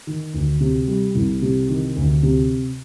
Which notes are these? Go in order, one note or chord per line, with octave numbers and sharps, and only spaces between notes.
D#3
D2
C3
G3
C2
C3
D#3
D2
C3